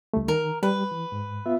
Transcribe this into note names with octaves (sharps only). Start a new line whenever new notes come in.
C#2 G3 A3
D#3 A#4
G3 B4
E3
G#2
B3 F4 E5